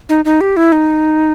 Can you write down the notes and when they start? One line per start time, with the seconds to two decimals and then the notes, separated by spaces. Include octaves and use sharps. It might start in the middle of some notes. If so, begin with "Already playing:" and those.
0.09 D#4
0.25 D#4
0.41 G4
0.57 E4
0.72 D#4